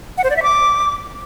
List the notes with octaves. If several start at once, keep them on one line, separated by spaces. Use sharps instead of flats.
F#5
C5
D5
E5
D6